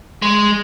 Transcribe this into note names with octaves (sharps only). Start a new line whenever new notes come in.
G#3